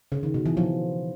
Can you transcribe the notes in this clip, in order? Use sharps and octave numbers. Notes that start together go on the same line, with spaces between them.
C#3
D#3
B2
E3
F3